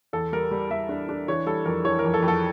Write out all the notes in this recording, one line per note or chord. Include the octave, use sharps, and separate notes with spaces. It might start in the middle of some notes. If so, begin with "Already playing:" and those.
E2 A4
G3 A#4
G3
G3 E5
D4
D4
E3 C#5
G3 A4
F2 A#4
E3 C#5
A#4
F2
A4
F2
A4